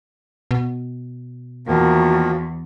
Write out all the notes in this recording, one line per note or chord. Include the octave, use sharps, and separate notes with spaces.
B2
E2 D#3 F3 A#3 F#4